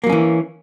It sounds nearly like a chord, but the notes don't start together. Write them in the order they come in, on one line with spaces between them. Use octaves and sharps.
A#3 F#3 C#4 E3